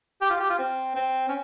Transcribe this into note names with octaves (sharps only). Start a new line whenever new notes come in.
G4
F4
G4
F4
C4
C4
C#4